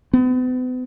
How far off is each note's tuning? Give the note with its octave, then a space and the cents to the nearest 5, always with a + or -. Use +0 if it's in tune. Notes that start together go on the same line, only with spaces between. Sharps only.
B3 +40